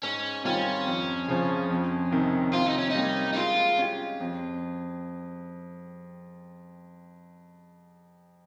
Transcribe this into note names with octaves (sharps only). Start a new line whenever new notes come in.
G#2 C#4
D#3 G3 C4 C#4 F4
F2
C#3 F3
F2
C3 D#3
C3 F4
D#4
C#4
D#4
G3 A#3 C#4
D#4
G#3 F4
C#4 G4
F2